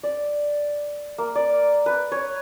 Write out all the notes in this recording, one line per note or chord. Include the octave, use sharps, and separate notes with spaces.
D5
A#3
D5
B4
C#5